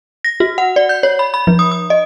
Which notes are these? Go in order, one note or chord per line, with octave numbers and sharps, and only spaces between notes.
A#6
F#4
F#5
D5
G6
C#5
B5
B5
F3
D#6
D#6
D#5